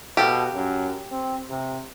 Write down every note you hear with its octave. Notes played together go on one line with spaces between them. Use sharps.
B2 G4 A4 F5
F#2
C4
C3